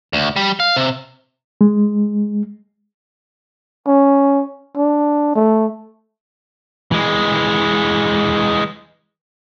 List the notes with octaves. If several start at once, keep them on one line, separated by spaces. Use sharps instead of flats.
D2
G3
F5
C3
G#3
C#4
D4
A3
E3 G#3